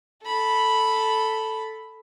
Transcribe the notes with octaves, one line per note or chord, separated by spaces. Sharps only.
A4 B5